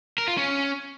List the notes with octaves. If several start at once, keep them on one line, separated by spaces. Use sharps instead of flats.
A#4
F4
C#4